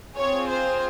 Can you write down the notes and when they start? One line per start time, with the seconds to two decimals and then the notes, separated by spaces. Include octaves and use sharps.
0.17 C4 F4 G#4 C#5
0.49 C5